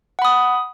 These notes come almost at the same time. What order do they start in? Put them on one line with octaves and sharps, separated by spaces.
F#5 B5 D#6